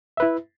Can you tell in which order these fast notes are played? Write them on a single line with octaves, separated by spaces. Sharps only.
E5 B4 E4